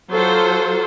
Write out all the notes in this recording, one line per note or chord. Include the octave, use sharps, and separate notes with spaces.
F#3 F4 A4 C5